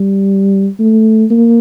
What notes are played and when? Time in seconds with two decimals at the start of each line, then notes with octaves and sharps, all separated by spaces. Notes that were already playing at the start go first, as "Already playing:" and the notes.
Already playing: G3
0.79 A3
1.30 A#3